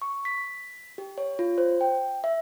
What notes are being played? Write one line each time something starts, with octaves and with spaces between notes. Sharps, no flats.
C#6
B6
G4
C#5
F4
C5
G5
E5